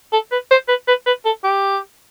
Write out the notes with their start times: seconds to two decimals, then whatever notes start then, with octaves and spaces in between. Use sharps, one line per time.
0.12 A4
0.32 B4
0.51 C5
0.68 B4
0.88 B4
1.06 B4
1.25 A4
1.44 G4